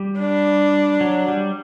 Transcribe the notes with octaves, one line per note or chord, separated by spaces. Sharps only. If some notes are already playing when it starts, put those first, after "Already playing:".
Already playing: G3
D4
F#3
G3